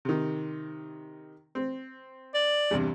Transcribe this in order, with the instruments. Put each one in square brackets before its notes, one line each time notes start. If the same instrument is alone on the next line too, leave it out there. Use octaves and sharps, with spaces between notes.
[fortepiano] C3 D#3
C4
[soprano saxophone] D5
[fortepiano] E2 G2 C3